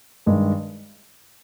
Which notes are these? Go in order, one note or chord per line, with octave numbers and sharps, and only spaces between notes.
G2 D#3 G#3